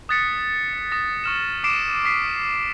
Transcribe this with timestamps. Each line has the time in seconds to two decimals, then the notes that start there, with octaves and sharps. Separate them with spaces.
0.09 D#6 F#6 A6 B6 C#7
0.91 D#6 A#6
1.24 C#6 F6 E7
1.64 D6 C7 D7 E7
2.05 D#6 B6 C7